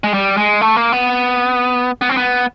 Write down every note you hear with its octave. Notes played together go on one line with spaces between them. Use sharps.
G#3
G3
G#3
A3
A#3
B3
B3
C4
B3